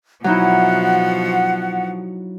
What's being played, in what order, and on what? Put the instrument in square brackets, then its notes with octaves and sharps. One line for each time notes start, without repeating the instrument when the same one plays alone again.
[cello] B2 F3 [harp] F#3 D#4 E4 [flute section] F#5